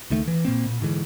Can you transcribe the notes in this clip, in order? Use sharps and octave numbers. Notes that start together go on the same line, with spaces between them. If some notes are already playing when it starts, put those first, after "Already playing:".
C#2 D#3 A3
E3
A#2 A#3 C4
A#2
G#2 D3 E3 G#3